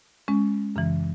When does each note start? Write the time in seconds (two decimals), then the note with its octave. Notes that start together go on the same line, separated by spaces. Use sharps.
0.28 G#3 C#4
0.76 F#2 C#3 E3